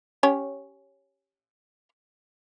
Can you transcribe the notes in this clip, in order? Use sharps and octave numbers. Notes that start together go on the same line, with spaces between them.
C#4 G4 C#5